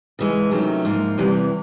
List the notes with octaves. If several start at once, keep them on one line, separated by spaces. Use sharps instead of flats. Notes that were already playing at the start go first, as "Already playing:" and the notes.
C#3 E3 G#3
C3 D#3 F#3 A3 C#4
G#2 F3 A#3
E2 C3 E3 G3